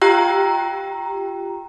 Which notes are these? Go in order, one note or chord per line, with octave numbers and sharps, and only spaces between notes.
F4 G4 G5 A#5